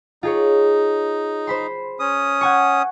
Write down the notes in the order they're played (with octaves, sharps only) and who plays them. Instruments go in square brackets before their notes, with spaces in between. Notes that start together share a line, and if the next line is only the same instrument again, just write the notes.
[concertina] D#4 [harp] F4 G#4 C#5
[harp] C5 B5 C6
[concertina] C#4 D#6
[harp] F#5 G#5 C#6